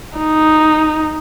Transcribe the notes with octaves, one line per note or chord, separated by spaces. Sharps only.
D#4